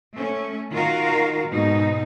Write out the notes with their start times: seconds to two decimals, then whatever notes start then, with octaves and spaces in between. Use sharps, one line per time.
0.13 A3 C#4
0.72 D#3 F4 F#4 A#4 F5
1.50 G#2 B2 D#4